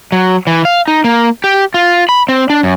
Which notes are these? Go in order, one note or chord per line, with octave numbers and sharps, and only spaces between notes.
F#3
E3
F5
D#4
A#3
G4
F4
B5
C4
D4
F#2